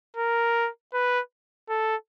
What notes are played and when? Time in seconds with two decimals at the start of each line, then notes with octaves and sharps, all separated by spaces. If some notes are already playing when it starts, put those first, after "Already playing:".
0.17 A#4
0.94 B4
1.69 A4